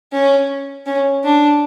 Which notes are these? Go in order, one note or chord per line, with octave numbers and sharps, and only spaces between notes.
C#4
C#4
D4